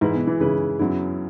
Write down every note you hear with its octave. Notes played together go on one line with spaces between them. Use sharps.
G#2 E3 G#3 E4 B4
B2
E3
C#3 E3 G#3 E4 B4
F#2 F#3 B3 E4